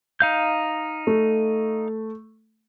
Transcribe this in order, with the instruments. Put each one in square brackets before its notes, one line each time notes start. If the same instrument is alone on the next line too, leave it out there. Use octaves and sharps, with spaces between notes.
[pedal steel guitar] D#4 F5 G6
[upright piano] A3